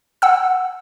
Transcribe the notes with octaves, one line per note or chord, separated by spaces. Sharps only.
F#5 E6